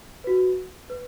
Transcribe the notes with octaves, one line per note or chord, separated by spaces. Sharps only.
F#4 B4
B4